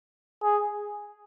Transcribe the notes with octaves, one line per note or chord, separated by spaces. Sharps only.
G#4